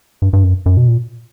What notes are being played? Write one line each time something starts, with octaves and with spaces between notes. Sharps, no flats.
G2
G2
F#2
F#2
B2
A#2